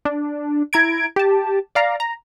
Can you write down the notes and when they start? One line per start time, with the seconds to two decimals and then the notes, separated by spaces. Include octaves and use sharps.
0.05 D4
0.73 E4 A#5 G#6 D7
1.16 G4 A5
1.75 D5 F5 A#5
2.00 A#5